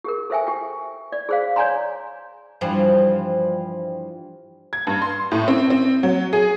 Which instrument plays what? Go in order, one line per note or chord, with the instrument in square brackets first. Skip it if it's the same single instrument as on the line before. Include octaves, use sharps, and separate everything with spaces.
[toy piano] G4 G#4 A#4
A4 C5 E5 G5 G#5
G4 G5
D5
G#4 C5 F5
C#5 D5 G#5 A#5 C6
[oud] G2 E3 F3
[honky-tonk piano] G#6
G2
C6
A2
C4
C4
F#3
G#4